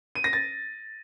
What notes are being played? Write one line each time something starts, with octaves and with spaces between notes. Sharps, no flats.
D#7
A#6
A6